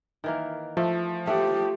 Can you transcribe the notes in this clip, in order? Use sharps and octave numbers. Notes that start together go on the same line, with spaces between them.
D#3 E3 A#3
F3 A3
A3 G4 F#5